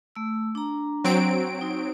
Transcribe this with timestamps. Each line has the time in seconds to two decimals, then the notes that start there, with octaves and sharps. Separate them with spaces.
0.16 A3 E6
0.55 D4 A#5
1.04 F#3 C4 D7
1.61 D#4